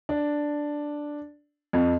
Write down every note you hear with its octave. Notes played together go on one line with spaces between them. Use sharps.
D4
F2